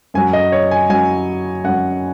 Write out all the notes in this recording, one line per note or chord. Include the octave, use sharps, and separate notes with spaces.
F#2 F#3 G#5
D#5
C#5
G#5
F#2 F#3 G#5
F#2 F#3 F#5